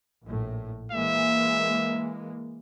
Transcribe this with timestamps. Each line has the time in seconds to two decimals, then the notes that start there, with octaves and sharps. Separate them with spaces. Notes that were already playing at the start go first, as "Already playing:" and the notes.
0.24 A#1 A2
0.92 E3 G#3 A#3 E5